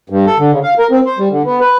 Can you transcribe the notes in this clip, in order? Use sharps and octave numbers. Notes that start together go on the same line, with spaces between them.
G2
A4
D3
C#3
F5
A#4
C4
C5
G3
D3
B3
B4